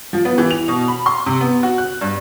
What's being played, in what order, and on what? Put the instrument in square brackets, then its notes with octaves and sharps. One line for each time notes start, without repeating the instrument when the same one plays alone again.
[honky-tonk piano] F3
B3
E3
F7
B2
B5
C6
C3
B3
F#4
F#6
G2